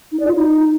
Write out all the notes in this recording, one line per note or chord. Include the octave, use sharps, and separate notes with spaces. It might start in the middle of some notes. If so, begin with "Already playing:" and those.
D#4
D5
F4
D#4